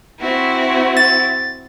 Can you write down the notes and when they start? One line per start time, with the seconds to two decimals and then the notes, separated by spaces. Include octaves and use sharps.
0.20 C4 E4 F#4
0.97 A6